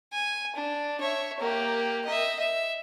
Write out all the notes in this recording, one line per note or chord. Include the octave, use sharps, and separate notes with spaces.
G#5
D4
C#5 E5
A#3 G4
D#5 E5
E5